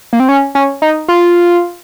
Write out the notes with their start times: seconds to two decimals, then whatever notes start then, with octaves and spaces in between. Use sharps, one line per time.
0.13 A#3
0.20 C4
0.29 C#4
0.55 C#4
0.82 D#4
1.08 F4